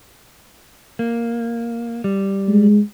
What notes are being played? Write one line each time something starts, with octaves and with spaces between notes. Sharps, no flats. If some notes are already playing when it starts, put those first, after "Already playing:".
A#3
G3
G#3